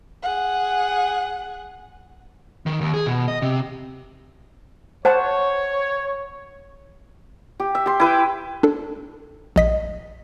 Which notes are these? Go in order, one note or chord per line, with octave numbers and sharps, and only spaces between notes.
G#4 F#5
D#3
D#2
G#4
B2
D#5
C3
C5 C#5 F#5 A5
G4
E5
G4 C6
E4 B4 G5
D4 A4
A#1 D#5 B6